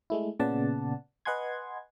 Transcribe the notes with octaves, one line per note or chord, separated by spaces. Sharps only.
G#3 A3 E4
A#2 C#3 B3 D5 F#5 A5
B4 D#5 F#5 G#5 C6 G#6